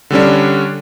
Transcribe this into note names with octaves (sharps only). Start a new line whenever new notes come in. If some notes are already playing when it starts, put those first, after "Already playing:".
D3 G3 C#4 D4